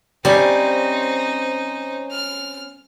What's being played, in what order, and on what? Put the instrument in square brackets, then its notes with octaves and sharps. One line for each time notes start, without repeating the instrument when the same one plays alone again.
[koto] G3 [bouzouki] C4 C#4 [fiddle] D#4 C5
[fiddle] F6